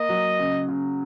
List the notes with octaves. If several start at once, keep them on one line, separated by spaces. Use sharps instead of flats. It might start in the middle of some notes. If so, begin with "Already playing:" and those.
Already playing: A#3 D#5
F#3
C#3
C#3